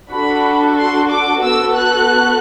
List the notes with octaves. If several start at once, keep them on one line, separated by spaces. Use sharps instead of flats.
D4 F#4 A4 B5
C6
D6
B3 F#4 A4 E6
F#6